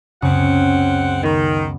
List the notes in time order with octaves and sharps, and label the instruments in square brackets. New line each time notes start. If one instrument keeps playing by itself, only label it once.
[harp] C#2 F#2 C#3 [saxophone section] C4 C#4 F#5
[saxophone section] D#3 [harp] B3